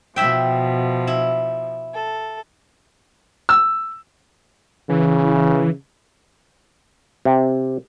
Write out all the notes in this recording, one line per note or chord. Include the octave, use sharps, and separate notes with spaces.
B2 F3 E4 E5 G5
E4
A4
E6
C#3 E3
C3